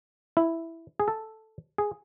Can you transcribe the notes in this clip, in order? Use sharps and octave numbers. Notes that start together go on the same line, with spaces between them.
E4
G#4
A4
G#4